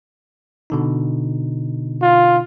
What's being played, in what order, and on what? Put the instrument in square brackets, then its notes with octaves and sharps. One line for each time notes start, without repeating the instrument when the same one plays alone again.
[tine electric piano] B2 D3 D#4
[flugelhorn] F4